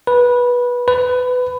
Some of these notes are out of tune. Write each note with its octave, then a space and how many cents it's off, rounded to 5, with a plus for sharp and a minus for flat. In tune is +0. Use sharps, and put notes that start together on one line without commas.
B4 -15
B4 +20